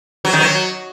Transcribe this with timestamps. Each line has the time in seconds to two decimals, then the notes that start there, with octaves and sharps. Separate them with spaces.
0.25 F#3
0.33 D#3
0.40 F#3